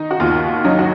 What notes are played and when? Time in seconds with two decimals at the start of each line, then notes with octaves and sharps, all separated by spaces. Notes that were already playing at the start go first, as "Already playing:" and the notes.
Already playing: D#3 D#4
0.11 F#4
0.20 D#2 F4
0.64 F#3 D#4
0.79 F#4